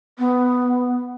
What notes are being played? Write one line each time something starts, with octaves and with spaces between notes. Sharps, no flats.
B3